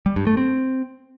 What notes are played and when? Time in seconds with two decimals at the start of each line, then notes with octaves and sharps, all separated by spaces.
0.06 G3
0.16 G2
0.27 A3
0.37 C4